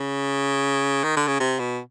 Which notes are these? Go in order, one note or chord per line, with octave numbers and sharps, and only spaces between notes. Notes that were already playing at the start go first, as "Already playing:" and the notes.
Already playing: C#3
D#3
D3
C#3
C3
B2